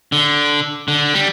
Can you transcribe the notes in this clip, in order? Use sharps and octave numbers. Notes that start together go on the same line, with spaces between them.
D3
D3
G3